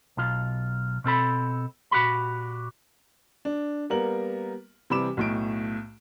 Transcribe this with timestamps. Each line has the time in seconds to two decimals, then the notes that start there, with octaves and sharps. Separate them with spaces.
0.17 B1 F4
1.04 B2 C4 A4 B5
1.91 A#2 F#4 G4 B5
3.45 D4
3.90 G3 A#3 B3 A#4 F#7
4.90 C3 E3 G3 B5 D6 E7
5.17 B1 A2 D7